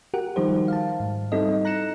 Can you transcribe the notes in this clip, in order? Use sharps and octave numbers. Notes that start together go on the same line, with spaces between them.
F#4 G4 A#4 F#5
D#3 F3 G3 D#4 G4 C5
F5 A5
G#2
G3 C4 D#4 E4 A4 D#5
A#5 F#6 A#6 C#7 E7